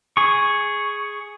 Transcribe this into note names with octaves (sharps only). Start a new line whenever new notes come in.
G#4 C#6